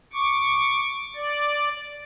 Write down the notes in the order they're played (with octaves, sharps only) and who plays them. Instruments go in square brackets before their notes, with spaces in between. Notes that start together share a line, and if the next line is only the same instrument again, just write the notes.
[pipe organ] C#6 D6
D5